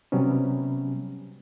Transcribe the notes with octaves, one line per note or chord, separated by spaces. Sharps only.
C3 F#3 G3 B3 C#4